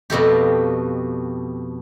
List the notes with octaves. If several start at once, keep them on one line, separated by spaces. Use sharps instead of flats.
F2 B2 A3 G4